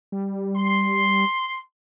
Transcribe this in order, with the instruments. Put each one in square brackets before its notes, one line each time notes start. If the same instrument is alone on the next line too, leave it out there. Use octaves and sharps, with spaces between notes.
[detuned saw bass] G3
[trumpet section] C6